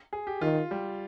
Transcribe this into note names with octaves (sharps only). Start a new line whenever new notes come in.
G#4
G4
D#3 F4
G3